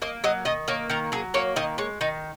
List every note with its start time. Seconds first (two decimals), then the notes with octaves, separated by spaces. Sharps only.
0.02 A#3 D#5
0.24 F#3 D#5
0.45 D#3 D#5
0.68 A#3 C#5
0.90 D#3 A#4
1.12 F#3 G#4
1.34 A#3 C#5
1.56 D#3 D#5
1.78 G#3 C#5
2.01 D#3 D#4